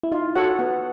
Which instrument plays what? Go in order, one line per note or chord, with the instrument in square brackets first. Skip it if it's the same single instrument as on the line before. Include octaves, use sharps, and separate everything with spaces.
[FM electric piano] E4
[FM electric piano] D#4 [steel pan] F4
[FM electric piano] F#4 [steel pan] A4 C#5 F#5
[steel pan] B3